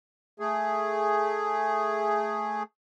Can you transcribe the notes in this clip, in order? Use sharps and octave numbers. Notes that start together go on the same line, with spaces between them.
A3 G#4